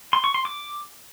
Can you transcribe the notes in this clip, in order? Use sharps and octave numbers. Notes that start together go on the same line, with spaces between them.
C6
C#6
C6
D6